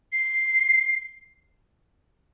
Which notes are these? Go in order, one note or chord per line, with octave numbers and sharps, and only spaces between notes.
C7